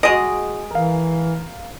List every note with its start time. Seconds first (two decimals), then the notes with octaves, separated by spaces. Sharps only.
0.03 G#3 F#4 G#4 D#5 D7
0.71 E3 A#4 F5